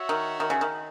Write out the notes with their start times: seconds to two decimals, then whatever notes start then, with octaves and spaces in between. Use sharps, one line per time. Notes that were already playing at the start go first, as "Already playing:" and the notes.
Already playing: F#4 C#5 E5
0.09 D#3
0.40 D#3
0.50 C#3
0.61 D#3